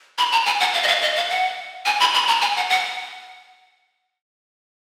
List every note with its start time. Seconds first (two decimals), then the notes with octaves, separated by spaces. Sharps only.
0.18 B5
0.32 A#5
0.46 G#5
0.60 F#5
0.74 F5
0.83 D#5
0.88 F5
1.02 D#5
1.16 F5
1.30 F#5
1.85 G#5
2.00 B5
2.14 B5
2.28 A#5
2.41 G#5
2.56 F#5
2.70 F#5